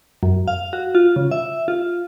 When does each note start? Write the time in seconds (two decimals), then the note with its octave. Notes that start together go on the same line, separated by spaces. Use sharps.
0.23 F#2
0.48 F5
0.73 F#4
0.95 F4
1.16 C#3
1.31 E5
1.68 F4